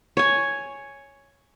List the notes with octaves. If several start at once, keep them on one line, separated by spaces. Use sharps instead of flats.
C#5 G#5